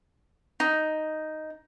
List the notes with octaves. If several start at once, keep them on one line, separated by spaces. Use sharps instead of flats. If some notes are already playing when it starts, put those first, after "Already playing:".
D#4